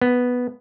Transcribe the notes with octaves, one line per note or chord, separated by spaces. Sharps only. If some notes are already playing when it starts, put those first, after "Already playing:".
B3